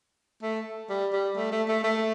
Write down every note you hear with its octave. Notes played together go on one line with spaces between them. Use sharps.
A3
G3
G3
A3
A3
A3
A3